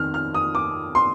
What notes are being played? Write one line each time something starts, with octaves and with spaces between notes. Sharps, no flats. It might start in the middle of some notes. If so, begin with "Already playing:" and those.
Already playing: F2 D#3 F6
F6
D#6
D6
C6